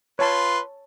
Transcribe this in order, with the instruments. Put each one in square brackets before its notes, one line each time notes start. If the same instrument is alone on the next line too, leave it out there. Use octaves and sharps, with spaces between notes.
[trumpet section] F4 B4 C6 [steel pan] C#5 A5